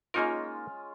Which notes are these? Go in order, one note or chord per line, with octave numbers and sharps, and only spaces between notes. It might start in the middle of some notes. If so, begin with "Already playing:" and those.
G#3 A#3 C#4 D#4 F4 A#4